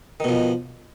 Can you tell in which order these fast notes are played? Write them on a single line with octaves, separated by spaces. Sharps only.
D#3 B2 F3